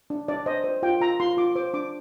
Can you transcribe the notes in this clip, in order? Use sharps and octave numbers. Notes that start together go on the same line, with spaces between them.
D4
D4 D5
C5 D#5
C5
F4 G5
F4 A#5
F4 C6
F4 D6
C5 D6
D4 D6